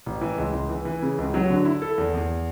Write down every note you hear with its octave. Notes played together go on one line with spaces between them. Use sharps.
A1
E3
C#2
C#2
E3
E3
C#3
C#2
F#3
D3
E4
A4
E2
E2